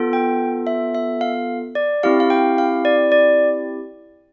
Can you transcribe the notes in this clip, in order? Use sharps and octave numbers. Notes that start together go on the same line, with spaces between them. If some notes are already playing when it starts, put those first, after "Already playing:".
Already playing: B3 F4 A4
G5
E5
E5
F5
D5
C4 E4 G4 F5
F5
G5
F5
D5
D5